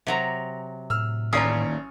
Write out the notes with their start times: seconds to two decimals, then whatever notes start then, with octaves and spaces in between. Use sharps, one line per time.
0.07 C3 F#3 A#5
0.90 A2 E6 F6
1.33 A1 D#2 C#4 D5 A#5 D#6 C7